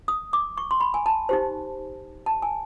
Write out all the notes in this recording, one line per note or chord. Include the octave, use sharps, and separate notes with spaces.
D#6
D6
C#6
C6
B5
G#5
A5
D#4 G4 C5
A5
G#5